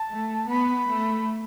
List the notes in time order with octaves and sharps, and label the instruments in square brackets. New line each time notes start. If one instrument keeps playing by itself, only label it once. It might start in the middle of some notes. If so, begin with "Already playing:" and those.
Already playing: [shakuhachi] A5
[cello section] A3
[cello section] B3 [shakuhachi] B5
[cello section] A3